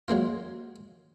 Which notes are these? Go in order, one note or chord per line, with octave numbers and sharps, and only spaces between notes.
F#3 G#3 A#3 F4